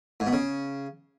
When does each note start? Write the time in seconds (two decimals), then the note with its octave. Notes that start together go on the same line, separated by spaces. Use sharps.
0.20 G#2
0.27 B2
0.33 C#3